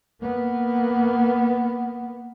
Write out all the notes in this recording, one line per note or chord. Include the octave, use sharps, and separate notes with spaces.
A#3 B3